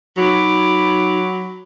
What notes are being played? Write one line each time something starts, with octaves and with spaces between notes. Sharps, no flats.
F#3 D#4 B5 D6